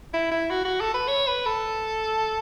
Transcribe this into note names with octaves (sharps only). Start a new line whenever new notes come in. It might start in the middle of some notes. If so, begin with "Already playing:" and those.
E4
E4
F#4
F#4
A4
B4
C#5
B4
A4